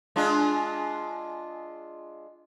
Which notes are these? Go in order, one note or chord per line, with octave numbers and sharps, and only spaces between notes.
G#3 D4 F4